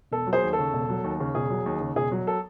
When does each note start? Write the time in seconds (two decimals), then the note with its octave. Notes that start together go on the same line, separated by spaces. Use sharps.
0.12 E1 A4
0.27 F#3
0.33 G#4 C5
0.43 D#2
0.53 A4
0.59 C#3
0.73 E1
0.89 F#3
1.04 D#2
1.20 C#3
1.35 E1 G#4
1.50 F#3
1.66 D#2
1.80 C#3
1.96 E1 G#4
2.12 F#3
2.27 A4